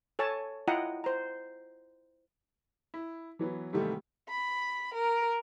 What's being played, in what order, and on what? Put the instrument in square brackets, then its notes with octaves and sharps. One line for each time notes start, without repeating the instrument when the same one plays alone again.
[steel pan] A4 C#5 G#5 A5
E4 F4 D#5 F#5 G5 A#5
C5 A#5
[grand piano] E4
E3 F#3 B3
G#2 C3 D#3 E3 G3 A3
[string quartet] B5
A#4